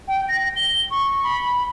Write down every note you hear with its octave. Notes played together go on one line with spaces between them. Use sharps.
G5
A#6
G7
C#6
B5